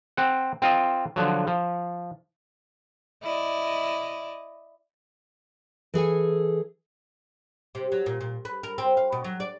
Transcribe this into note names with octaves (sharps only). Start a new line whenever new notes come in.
C4 F#5
C4 F4 D#5
D3 F3 F#3
F3
E4 D5 D#5
E3 G#4 A4 G#5
C3
F#3
A#2
A#2
B4
A#4
C4
F5
B2
F#3
D5